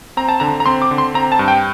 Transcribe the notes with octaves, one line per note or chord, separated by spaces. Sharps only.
C4 A#5
A5
D3 A#5
A#5
C4 C6
D6
D3
C6
C4 A#5
A5
G2
G5